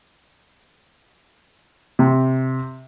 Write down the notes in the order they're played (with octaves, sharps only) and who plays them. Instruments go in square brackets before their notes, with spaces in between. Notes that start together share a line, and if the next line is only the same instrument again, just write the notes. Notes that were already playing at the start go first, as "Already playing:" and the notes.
[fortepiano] C3